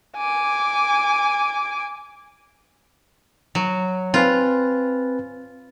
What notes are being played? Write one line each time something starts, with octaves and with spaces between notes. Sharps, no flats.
G#5 D6
F#3
C4 F4 B4 G#5